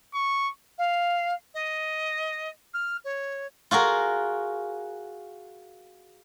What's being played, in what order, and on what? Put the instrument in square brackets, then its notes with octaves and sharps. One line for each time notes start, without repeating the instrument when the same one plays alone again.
[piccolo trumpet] C#6
[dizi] F5
D#5
F6
C#5
[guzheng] F4 F#4 G#4 A#4